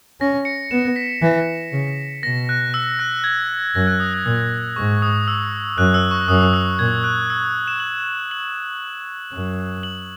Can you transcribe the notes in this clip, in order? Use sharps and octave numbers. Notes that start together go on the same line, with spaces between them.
C#4 A#6
C#7
B3 E7
B6
E3
C#3
B2 A#6
F#6
E6
F#6
G#6
F#2 A#6
F#6
D#6
F#6
A#2 E6
G#2 C#6
D#6
E6
F#2 F#6
E6
C#6
F#2 D#6
E6
A#2 G#6
F#6
E6
E7
F#7
F#7
F#2
F#7